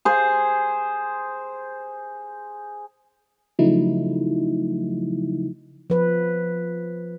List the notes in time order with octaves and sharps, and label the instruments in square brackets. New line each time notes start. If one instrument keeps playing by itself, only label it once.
[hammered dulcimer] G#4 C5
[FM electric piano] C#3 F3 F#3 A3 D#4 E4
[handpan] F3 B4